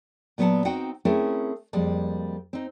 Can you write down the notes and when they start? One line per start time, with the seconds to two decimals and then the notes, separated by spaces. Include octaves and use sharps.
0.38 A#2 F#3 B3 G#4 F#5 A5
0.65 C4 D#4 F#4 F#5 G5
1.05 A3 C4 C#4 E4 G#4 A#4
1.73 F2 G3 G#3 A#3
2.53 C4 D#4